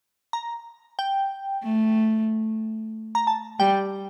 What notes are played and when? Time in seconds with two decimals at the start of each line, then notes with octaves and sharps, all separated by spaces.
0.33 A#5
0.99 G5
1.63 A3
3.15 A#5
3.27 A5
3.59 G3 G5